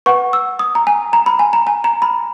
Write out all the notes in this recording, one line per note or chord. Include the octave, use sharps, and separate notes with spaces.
B4 F#5 C#6
E6
D#6
A#5
G#5
A#5
B5
G#5
A#5
G#5
A#5
B5